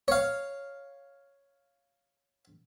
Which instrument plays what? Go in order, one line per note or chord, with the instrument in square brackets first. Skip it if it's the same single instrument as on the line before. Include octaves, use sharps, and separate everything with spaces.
[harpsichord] C#5 F5